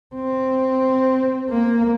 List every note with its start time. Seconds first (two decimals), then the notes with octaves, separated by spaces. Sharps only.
0.16 C4
1.50 A#3